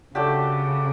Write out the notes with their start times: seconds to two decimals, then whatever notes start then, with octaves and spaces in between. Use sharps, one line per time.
0.15 C#3 F#3 A3 D4 G4